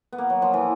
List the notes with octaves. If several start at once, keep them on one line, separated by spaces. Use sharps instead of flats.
B3
A#3
F#3
F3
E3